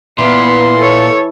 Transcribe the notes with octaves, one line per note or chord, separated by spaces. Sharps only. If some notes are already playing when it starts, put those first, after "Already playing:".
A#2 E3 B3 E4 C6
A4 C#5